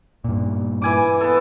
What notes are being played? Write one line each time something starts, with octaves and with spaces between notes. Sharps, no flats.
G2 A#2
E3 G#5 D6
B3 A4